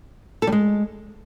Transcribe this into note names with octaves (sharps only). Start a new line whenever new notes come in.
A4
G3
G#3